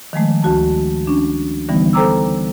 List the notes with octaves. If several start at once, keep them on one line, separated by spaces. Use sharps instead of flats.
D#3 F3 G#3 A3
D2 F#4 A5
C#4 D4
D3 E3 G3 B3 D#4
A4 C5 G5 A#5 D6 E6